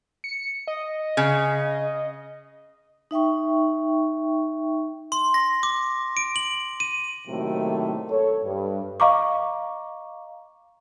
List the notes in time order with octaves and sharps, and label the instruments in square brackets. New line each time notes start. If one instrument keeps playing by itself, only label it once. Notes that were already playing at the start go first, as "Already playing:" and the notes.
[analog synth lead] C#7
D#5
[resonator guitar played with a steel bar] C#3
[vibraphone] D#4 E5 G5 C#6
[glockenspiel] C6
A#6
D6
D7
F#7
D#7
[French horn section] A2 C3 D#3 F#3 A3 A#3
A4 C#5
G2
[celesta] D#5 F5 A#5 C#6 D6